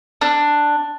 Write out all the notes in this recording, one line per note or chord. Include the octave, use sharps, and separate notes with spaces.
D4